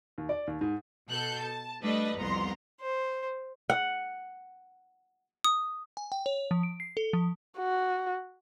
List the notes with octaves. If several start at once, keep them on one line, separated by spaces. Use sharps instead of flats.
D#2
D5
D#2
G#2
B2 A4 F#6 G6
A5
G3 A3 D4 B4 D#5
C2 F2 B3 A#5 C6
C5
F#5
D#6
G#5
G5
C#5
F3
D7
C7
A4
F3
F#4